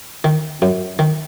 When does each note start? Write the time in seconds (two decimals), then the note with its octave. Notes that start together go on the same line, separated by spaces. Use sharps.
0.24 D#3
0.62 F#2
0.99 D#3